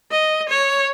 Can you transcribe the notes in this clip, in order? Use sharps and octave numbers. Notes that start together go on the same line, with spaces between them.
D#5
C#5